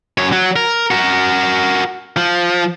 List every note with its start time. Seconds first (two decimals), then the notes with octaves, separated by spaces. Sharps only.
0.18 F#2 C#5
0.32 F#3
0.56 A#4
0.91 F#4 A#4
2.17 F3